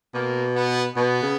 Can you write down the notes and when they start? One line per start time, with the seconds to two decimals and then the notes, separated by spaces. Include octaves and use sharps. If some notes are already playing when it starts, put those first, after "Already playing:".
0.14 B2 A#3
0.55 B3
0.95 B2 B3
1.22 C#3